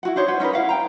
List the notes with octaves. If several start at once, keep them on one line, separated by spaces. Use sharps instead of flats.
E4 F#4 F#5
D4 D#4 C5 C#5
B4 C5 F#5
C#4 D#4 A#4 B4
E4 F5 F#5
G5 A#5